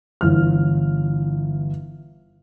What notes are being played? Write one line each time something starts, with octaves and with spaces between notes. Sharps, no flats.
G1 E3 F6